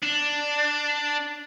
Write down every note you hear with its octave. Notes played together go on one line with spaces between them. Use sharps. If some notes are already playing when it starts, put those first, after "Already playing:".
D4